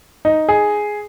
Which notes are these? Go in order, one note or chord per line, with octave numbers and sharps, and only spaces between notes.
D#4
G#4